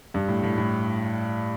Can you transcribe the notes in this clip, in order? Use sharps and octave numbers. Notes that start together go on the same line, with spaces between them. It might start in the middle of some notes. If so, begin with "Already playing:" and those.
G2
A2
A2
A2